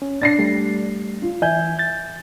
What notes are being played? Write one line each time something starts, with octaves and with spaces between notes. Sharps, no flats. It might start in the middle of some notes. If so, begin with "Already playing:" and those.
C#4
D4 A6 A#6 C7
G3 A3
F4
E3 E5 G#5 G6
G6 A6